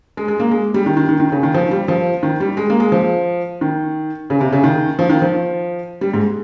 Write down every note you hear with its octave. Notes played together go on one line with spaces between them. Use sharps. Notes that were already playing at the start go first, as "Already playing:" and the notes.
G#3
G#3
A#3
G#3
G3
D#3
D#3
D#3
D#3
C#3
D#3
F3
G3
F3
D#3
G3
G#3
A#3
G#3
F3
D#3
C#3
C3
C#3
D#3
F3
D#3
F3
G3
G#2